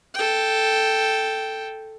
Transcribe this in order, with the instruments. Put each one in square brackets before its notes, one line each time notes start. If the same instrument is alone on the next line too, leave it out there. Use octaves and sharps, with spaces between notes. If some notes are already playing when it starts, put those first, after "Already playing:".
[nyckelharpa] A4 G5